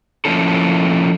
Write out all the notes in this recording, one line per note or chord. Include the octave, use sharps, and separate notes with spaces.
F3 A#3 C#4 E4 A4